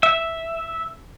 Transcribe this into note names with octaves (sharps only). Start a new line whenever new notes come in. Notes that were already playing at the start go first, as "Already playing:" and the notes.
E5